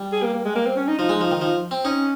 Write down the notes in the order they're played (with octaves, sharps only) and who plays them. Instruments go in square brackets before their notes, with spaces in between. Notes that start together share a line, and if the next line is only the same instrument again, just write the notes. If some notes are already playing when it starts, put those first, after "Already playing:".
Already playing: [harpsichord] G3
[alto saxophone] G#4
A#3
A#3
G#3
A#3
C4
C#4
D#4
[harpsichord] F3 [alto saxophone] D#4
[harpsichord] G#3
F3
D#3
F3
C4
[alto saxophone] C#4 [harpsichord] D#4